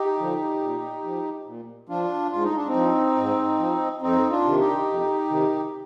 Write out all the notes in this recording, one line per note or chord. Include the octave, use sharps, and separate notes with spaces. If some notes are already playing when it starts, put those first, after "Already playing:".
Already playing: D#4 G4
D3 F3
A#2
F3
A#2
F3 D4 F4
G#2 F4
D#4
D4
C4 D#4
F3
G#2
F3
F2 C4 D#4
D4 F4
C3 D#3
D#4 G4
F2
C3 D#3